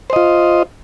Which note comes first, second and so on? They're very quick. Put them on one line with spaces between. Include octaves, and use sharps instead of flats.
C5 D#5 F4